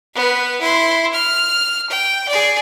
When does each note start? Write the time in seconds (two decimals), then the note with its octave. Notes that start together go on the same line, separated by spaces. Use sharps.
0.14 B3 B4
0.61 E4 C6
1.13 F6
1.89 G5
2.28 G#4 D5